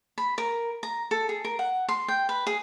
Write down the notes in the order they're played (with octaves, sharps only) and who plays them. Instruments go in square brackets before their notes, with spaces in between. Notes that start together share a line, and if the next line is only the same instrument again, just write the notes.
[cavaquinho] B5
A#4
A#5
A4
G#4
A#4
F#5
C6
G5
B4
G#4